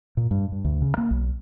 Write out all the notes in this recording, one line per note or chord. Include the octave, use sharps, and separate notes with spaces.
A#2
G2
G2
D2
C#3
A#3
B1